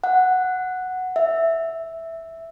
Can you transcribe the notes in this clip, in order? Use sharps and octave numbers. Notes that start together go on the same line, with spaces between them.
F#5
E5